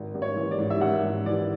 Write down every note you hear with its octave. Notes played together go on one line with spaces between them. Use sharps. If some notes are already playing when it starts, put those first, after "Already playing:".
Already playing: G#1
G#1
C#5
E3
D5
G#2
E5
G#1 F#5
G#1
E3 D5